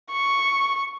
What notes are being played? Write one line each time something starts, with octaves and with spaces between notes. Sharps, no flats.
C#6